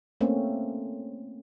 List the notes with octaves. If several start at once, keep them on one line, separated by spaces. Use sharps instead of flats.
A3 A#3 C4 C#4